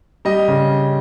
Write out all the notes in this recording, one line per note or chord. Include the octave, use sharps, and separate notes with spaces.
G3 D#5
C#3